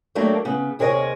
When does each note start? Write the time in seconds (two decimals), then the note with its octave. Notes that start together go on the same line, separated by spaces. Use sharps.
0.15 F#3 A3 A#3 D4 G4
0.45 C#3 B3
0.79 D#2 C3 G#4 A#4 C#5 D#5